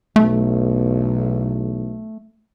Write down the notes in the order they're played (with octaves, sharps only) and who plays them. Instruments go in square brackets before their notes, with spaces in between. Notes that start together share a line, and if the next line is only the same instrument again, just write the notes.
[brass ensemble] B1 E2 [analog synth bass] A3